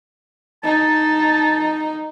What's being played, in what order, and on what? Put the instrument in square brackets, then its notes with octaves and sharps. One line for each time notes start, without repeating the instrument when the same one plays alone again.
[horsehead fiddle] D#4 [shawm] A5